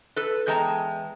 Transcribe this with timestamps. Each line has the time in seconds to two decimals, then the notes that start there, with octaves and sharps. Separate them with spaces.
0.16 A4 B4
0.47 E2 G#3 G5 A5 A#5